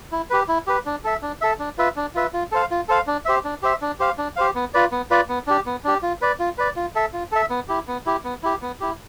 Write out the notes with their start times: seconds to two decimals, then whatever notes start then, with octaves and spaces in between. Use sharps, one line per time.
0.12 E4
0.30 G4 B4
0.48 E4
0.67 G4 B4
0.86 D4
1.04 A4 E5
1.22 D4
1.41 A4 E5
1.59 D4
1.78 F4 B4 E5
1.96 D4
2.15 F4 B4 E5
2.33 F4
2.52 A4 C5 F5
2.71 F4
2.88 A4 C5 F5
3.07 D4
3.25 G4 C5 E5
3.45 D4
3.62 G4 C5 E5
3.82 D4
4.00 G4 C5 F5
4.18 D4
4.36 G4 C5 F5
4.55 B3
4.74 F4 B4 D5
4.92 B3
5.11 F4 B4 D5
5.29 B3
5.47 D4 G4
5.66 B3
5.84 D4 G4
6.03 F4
6.22 B4 D5
6.39 F4
6.58 B4 D5
6.76 F4
6.95 A4 E5
7.13 F4
7.32 A4 E5
7.50 B3
7.69 E4 G4
7.88 B3
8.06 E4 G4
8.24 B3
8.43 E4 G4
8.62 B3
8.80 E4 G4